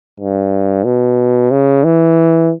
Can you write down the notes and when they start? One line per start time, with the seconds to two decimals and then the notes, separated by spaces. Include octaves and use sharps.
0.20 G2
0.85 B2
1.51 C#3
1.84 E3